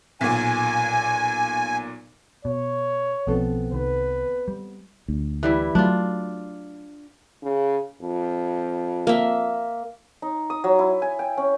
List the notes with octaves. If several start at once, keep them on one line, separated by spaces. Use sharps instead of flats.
B1 A#2 G#5
B2 C#5
B1 B2 F3 B3 C4 A4
C2 D#3 B4
G3
D2
E3 G3 E4
F#3 A3 D4 F4
C#3
F2
A#3 E5
D#4
D#6
F#3
E4
G#5
G5
C#4